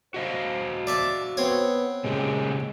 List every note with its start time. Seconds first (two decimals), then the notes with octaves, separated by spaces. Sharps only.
0.14 F#4 C5 D#5 F5
0.87 D5 E5 A5
1.37 B3 C4 C#5
2.04 A#2 C#3 G#3 G4